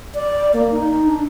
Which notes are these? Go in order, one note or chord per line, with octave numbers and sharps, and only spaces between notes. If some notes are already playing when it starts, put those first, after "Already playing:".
D5
A#3
D#4
D4